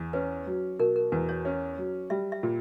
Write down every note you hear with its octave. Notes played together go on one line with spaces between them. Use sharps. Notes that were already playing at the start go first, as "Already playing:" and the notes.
Already playing: E2
C#4 B4
F#3
B2 A#4
A#4
E2 B4
C#5
C#4
F#3
G3 E5
E5
A#2